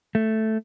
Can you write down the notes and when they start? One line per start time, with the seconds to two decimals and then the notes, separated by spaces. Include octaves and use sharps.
0.15 A3